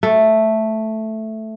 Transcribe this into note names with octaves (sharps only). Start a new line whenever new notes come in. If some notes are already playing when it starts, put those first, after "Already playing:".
A3